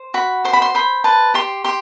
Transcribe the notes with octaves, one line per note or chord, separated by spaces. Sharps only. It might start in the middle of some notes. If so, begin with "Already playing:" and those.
Already playing: C5
F#4 B5
C5 C6
B5
C6
C5 B5
B4 A5
G4 C6
G4 C6